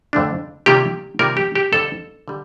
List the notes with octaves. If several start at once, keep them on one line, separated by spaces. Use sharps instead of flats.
F2 D3 A3 D4
C3 D#3 G3 A#3 F4 G4
C3 D#3 G3 A#3 F4 A#4
G4
G4
F2 D3 G3 A4
D3 G3